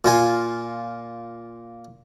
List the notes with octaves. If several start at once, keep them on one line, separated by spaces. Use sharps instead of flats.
A#2 F4 G#5